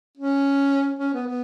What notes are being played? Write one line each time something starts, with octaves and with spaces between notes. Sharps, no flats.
C#4
C#4
B3
B3